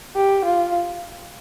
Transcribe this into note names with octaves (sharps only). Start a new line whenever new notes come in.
G4
F4